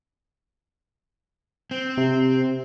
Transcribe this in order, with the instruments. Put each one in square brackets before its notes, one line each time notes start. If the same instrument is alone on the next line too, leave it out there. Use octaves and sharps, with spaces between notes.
[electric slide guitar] C4
[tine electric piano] C3